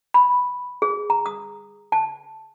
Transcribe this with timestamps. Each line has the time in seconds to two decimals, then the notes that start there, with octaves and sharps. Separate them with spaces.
0.14 B5
0.82 G#4
1.10 A#5
1.26 D#6
1.92 A5